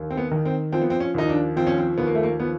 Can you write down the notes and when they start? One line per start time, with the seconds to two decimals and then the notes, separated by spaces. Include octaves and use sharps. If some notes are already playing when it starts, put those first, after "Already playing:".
Already playing: D#2
0.10 C4
0.17 B3
0.31 D#3
0.45 C4
0.72 F3 C4
0.81 B3
0.90 C4
1.00 C#4
1.14 D#2 D#4
1.29 D4
1.56 F3 C4
1.67 C#4
1.78 C4
1.98 D#2 B3
2.07 A#3
2.15 A3
2.23 A#3
2.40 F3 B3